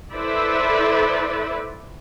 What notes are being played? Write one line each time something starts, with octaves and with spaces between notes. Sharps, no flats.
E4 A4 B4 C5 D5 E5